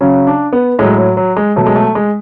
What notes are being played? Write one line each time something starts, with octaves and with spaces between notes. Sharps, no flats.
C#3 F#3 C#4
D4
B3
A2 F#3 G#3
F#3
F#3
G#3
B2 F#3 A3
G#3
A3
G#3